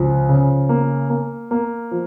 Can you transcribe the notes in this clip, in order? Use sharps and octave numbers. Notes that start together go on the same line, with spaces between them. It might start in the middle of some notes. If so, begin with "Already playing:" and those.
Already playing: C#2 F3
C#3
A#3
A#3
A#3
F3